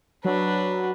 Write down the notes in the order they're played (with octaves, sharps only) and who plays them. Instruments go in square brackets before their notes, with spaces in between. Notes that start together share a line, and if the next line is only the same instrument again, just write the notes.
[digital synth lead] F#3 [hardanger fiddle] D4 B4